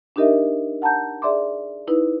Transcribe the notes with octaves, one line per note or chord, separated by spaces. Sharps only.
D4 D#4 G4 A#4 D#5 E5
F#5 A5 A#5 G6
G#4 D5 E5 C6 D6
D#4 E4 B4